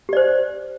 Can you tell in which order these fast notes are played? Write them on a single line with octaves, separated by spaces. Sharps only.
G4 D5 C5